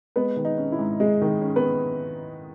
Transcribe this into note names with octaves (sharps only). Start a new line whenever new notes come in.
G#3 B3 B4
D#3
D#4
C#4
E4
G#2
G#3 G#4
D#3
C#4
B3 B4